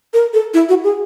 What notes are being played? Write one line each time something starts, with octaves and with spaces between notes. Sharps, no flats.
A#4
A4
E4
F#4
G#4